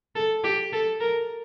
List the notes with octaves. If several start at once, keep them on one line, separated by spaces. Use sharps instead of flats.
A4
G4
A4
A#4